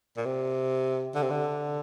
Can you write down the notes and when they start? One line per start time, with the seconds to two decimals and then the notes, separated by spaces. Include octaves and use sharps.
0.17 A#2
0.25 C3
1.15 D3
1.22 C3
1.30 D3